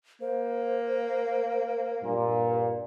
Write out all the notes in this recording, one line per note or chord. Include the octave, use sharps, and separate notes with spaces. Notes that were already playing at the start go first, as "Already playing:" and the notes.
A#3 C5
G2 A#2